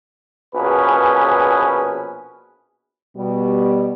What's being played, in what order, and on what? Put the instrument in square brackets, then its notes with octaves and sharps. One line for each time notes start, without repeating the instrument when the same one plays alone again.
[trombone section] A#1 B2 C#4 G#4 B4
[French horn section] B2 G3